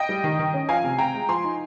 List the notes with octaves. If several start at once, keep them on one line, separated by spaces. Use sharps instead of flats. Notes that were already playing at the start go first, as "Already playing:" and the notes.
Already playing: D#5 G5
G3
D#3
D#3
C#4
F3 F5 G#5
C3
C3 G5 A#5
G#3
F3 G#5 C6
D#4